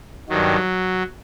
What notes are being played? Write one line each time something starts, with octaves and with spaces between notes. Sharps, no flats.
G2 D#3 F#3